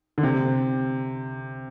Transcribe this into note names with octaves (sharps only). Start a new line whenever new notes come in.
D3
C3